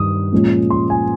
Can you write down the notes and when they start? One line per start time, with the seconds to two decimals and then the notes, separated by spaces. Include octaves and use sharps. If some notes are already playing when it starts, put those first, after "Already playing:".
Already playing: G2 D#3 G3 D#6
0.32 A#2 F3 G#3 C#4 F4
0.70 C6
0.90 G#5